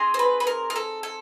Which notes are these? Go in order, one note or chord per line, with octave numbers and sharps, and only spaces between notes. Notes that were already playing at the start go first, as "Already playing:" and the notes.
Already playing: C4 D#4 G#4
C5
B4
B4
A#4
A#4
A4
A4